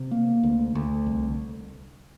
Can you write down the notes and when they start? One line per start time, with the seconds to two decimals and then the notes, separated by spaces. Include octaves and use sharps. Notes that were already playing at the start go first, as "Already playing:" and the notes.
Already playing: C3
0.11 A#3
0.43 D2
0.75 D2
1.06 C2